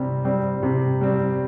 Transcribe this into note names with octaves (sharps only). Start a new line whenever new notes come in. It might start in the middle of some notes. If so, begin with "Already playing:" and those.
Already playing: C3 G3 C4
G3 C4
C3
G3 C4